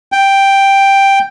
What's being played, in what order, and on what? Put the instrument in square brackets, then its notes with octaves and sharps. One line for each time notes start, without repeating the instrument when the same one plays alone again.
[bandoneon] G5